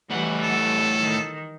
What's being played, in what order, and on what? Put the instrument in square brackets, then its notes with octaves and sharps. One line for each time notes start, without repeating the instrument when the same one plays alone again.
[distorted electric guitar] A2 F#5 [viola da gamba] E3 G3
[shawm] A4
[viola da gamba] D#3